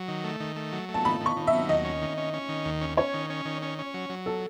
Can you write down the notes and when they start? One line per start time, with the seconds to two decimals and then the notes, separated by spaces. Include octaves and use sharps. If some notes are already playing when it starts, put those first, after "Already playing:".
Already playing: F#3
0.08 D#3
0.24 A3
0.40 D#3
0.56 A3
0.72 F#3
0.89 A3
0.94 A5
1.05 D#3 B5
1.21 D#3
1.26 C#6
1.37 D#3
1.47 E5
1.53 F#3
1.69 D#2 D#5
1.85 C#4
2.02 D#3
2.18 C#4
2.34 C#4
2.49 D#3
2.65 D#2
2.81 C#4
2.97 C#4 C#5
3.14 D#3
3.30 C#4
3.45 D#3
3.62 C#4
3.78 C#4
3.94 F#3
4.10 F#3
4.26 A4